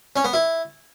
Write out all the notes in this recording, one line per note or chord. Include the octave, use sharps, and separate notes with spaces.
C#4
B3
E4